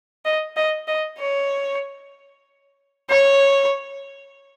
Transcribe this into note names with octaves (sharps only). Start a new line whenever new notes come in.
D#5
D#5
D#5
C#5
C#5